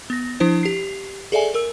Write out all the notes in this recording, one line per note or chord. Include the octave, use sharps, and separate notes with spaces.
B3 A#6
F3 D4 E4 C5
G4 C7
G#4 A4 D5 E5 G#5
A#4 E6